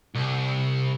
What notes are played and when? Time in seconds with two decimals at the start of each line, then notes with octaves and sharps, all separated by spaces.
0.15 C2